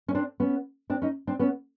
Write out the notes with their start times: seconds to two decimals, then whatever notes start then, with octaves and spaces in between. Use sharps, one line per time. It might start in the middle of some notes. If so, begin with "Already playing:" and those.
0.08 C#4
0.15 C4 D4
0.40 B3 C#4
0.90 C4 D4
1.02 C#4 D#4
1.27 C4 D4
1.39 B3 C#4